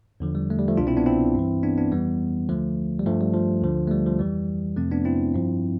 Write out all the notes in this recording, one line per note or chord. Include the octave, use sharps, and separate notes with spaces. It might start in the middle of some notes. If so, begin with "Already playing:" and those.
E2 D3 F3
G3
A3
G3
F3 A3
C2 B2 D4 F4
C4 E4
B3 D4
C4 E4
G2 E3
B3 D4
B3 D4
F2 E3 G3 B3
D2 D3 F3 A3
G3
G2 F3 A3
G3
F3
D2 D3 F3
A3
G3
F3
F2 E3 G3
F2 C3 F3 A3 C4
B3 D4
C4 E4
G2 F3